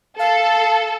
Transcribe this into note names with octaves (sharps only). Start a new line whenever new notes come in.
A4 F5